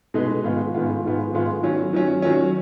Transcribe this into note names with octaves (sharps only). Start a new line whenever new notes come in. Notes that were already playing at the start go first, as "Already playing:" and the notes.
B2 G#3 D#4 G#4 B4
G#2 D#3 G#3 B3 F4
G#2 D#3 G#3 B3 F4
G#2 D#3 G#3 B3 F4
G#2 D#3 G#3 B3 F4
D#3 F#3 C#4
D#3 F#3 C#4
D#3 F#3 C#4